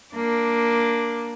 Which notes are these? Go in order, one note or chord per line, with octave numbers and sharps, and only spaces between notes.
A#3 D4